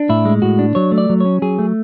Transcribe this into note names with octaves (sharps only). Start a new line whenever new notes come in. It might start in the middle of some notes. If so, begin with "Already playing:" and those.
Already playing: D4
A2 E4
G#3
A2 F#4
D4
F#3 C#5
A3
D5
F#3
C#4 C#5
F#3 G#4
A3